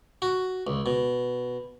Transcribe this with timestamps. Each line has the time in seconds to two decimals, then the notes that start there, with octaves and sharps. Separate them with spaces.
0.22 F#4
0.67 C#2
0.86 B2